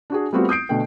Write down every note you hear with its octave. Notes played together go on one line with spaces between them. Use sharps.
D4 F#4 G#4
G3 A3 B3 C4 F4 F#4
D#6 G6 C7 D7
B2 D3 A3 G5